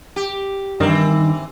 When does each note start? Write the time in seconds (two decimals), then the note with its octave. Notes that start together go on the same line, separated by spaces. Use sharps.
0.16 G4
0.80 G2 D#3 E3 C4